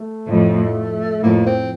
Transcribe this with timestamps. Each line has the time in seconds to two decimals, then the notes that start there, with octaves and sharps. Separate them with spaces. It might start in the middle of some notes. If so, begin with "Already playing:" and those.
Already playing: A3
0.28 F2 A2
1.23 F2 A2 A#3
1.46 C4